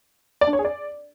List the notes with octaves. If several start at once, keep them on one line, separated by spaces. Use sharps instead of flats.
D5
D4
C#5
G#4
D5